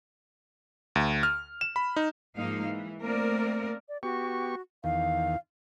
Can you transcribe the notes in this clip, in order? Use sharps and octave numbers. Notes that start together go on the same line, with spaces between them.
D2
F6
E7
B5
D#4
G#2 F3 G#3 A#3 D#4 F5
E3
A3 A#3 C4 A#4 D5
D5
B3 F#4 G4 C#6
E2 D#3 F5